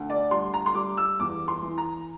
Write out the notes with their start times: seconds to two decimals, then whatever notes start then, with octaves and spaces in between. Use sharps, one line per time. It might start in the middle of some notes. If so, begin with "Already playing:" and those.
Already playing: D2
0.10 D5
0.31 G3 C6
0.54 A#5
0.66 C6
0.75 G3 D6
0.97 E6
1.20 E2 D6
1.48 C6
1.62 E3
1.78 A#5